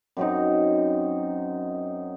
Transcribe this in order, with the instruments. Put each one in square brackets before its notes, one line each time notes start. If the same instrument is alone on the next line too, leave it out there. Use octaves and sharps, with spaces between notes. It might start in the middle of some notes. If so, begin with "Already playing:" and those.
[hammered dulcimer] F#2 F#3 C4 D#4